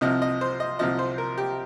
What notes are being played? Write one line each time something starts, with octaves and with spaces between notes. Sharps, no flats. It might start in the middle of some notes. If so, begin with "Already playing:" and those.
C2 C3 F3 D#5
D#5
C5
D#5
C2 C3 F3 D#5
C5
A#4
G4